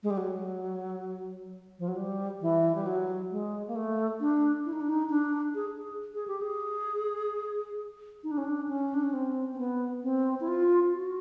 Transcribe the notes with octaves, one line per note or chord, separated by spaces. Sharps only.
G#3
G3
F#3
F3
F#3
G3
E3
G3
F#3
G#3
A#3
A3
D4
E4
D#4
D4
D#4
D4
G#4
G#4
G#4
G4
G#4
D#4
D4
C#4
D4
C#4
D4
C#4
C4
C4
B3
C4
E4
F4
F#4